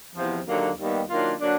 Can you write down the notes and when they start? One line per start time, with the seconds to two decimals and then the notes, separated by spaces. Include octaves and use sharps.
0.15 E2 C3 F3
0.46 D#2 D3 F#3 A#3
0.78 D#2 D#3 G3 B3
1.09 D#3 F#3 A#3 D4 F4
1.40 D3 F#3 A#3 D4